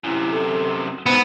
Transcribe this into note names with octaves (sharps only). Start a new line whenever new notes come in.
F#2 C3 E4
A4
G#2 B3 C5